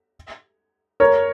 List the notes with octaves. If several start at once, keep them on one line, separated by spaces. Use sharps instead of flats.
A#4 C#5